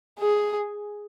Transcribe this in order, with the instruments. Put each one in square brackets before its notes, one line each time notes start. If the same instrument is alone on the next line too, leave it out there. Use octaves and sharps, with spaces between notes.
[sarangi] G#4